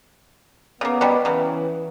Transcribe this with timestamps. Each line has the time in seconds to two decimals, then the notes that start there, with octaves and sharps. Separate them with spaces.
0.81 C#3 A#3 B3
1.01 B2 F#3 G3
1.25 C#3 E3 F#3